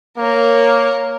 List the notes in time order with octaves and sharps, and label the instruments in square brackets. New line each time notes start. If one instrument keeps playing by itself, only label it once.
[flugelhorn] A#3 [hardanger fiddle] A#4 C#5